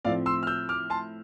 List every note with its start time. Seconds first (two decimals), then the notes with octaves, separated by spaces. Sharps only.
0.05 A2 F3 A3 C4 D5 F5
0.26 C6 E6
0.43 F6
0.47 E6 G6
0.69 D6 F6
0.90 A5 C6